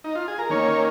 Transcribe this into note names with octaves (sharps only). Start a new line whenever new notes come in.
D#4
F4
G#4
A#4
D#3 A#3 C#4 C#5